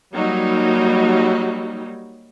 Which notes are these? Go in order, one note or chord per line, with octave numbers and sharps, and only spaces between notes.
F#3 G3 A#3 D#4